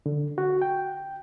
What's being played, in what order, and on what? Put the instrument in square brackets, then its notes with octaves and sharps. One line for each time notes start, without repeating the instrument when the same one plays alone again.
[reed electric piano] D3
F#4
G5